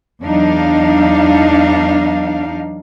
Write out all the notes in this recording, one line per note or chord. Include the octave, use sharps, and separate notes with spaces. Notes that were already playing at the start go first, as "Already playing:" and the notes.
E2 F#3 D4 D#4 F5